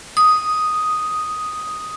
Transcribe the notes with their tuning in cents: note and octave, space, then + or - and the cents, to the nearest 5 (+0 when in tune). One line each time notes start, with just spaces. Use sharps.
D#6 +0